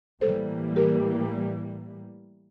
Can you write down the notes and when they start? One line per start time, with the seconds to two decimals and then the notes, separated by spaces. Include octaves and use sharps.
0.21 A2 E3 G3 A#3 A4 C5
0.76 G4 A#4